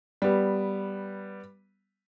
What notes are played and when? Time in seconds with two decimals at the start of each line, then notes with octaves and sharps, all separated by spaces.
0.22 G3 B3